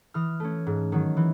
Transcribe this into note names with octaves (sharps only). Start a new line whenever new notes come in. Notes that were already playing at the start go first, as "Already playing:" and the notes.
E3 D#6 F6
A3 C#4
G#2
D#3 F#3
E3